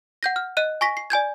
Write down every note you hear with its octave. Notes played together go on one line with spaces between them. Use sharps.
F#5 G6 A#6
F6
D#5 F#6 D#7
G#5 C#6 A#6 B6
C7
D5 G#5 G6 G#6